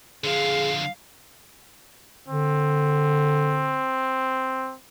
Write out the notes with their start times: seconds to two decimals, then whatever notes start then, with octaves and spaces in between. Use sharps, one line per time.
0.24 D3 F3 G#4 F5
2.28 D3 C4